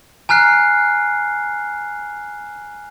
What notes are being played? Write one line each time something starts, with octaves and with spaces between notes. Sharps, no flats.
G#5 A#5 F6 F#6 C7